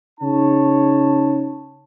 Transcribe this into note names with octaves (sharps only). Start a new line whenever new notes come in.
C#3 D#4 C#5 A5